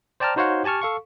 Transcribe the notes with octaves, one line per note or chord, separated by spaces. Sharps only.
C5 D5 G5 A5 A#5 F6
D#4 F#4 C5 C#5 F5 F#5
G4 G#5 A5 C#6 F6
A4 F5 C#6